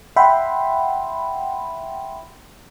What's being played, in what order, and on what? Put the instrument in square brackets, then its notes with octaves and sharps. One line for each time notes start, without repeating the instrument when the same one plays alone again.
[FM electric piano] E5 F#5 G5 B5 C6